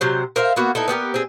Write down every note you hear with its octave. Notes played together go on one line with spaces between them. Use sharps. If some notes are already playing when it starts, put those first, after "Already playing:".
C3 F#3 C5
A#4 C5 E5 F5
A#3 B3 F#4
B3 D#4 E4 A4
B3 G4 G#4 A#4
C4 G#4